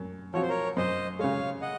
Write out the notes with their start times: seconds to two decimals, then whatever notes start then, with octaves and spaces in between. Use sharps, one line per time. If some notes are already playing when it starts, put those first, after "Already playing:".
Already playing: F#2
0.34 F3 C4 F#4 C#5
0.42 C5
0.49 A#4 C#5
0.77 F#2 C5 D#5
1.19 C#3 G#3 C#5 F5
1.62 D#5 F#5